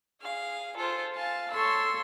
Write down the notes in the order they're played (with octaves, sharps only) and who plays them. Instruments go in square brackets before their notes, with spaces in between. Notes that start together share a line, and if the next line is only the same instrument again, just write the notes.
[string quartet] G#4 F5
F4 A4 C5
F5 G#5 A5
A4 C#5 C6 E6